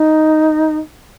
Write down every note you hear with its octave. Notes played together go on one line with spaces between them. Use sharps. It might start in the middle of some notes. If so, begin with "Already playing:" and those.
Already playing: D#4